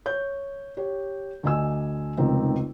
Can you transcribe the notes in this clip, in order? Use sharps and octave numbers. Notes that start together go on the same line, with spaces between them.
C#5 G6
G4 C#5
D2 D4 D#5 G#5 E6
F1 C#2 D#3 C4 D#4